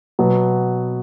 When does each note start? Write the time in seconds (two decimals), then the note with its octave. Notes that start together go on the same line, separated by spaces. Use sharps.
0.19 B2 F#3 B3